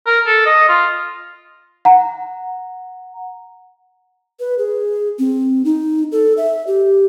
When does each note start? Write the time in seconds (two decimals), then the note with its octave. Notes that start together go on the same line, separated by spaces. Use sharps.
0.07 A#4
0.27 A4
0.46 D#5
0.69 F4
1.85 F#5 A#5
4.40 B4
4.58 G#4
5.19 C4
5.65 D#4
6.12 A4
6.37 E5
6.67 G4